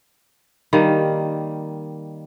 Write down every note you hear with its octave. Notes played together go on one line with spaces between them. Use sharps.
D#3 G3 A#3